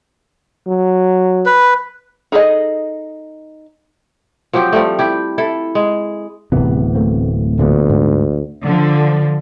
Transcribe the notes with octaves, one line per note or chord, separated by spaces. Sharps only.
F#3
B4
D#4 G#4 A4 B4 D#5
F3 F#3 C4 G4
F3 G3 A3
E4 G4
E4 A4
G#3
D1 C3 E3 B3
A3 A#3 C4
D2 A#2 D3 B3
G#2
D3 F3